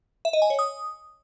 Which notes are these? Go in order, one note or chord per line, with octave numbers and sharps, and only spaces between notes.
E5
D#5
G#5
C#5
D#6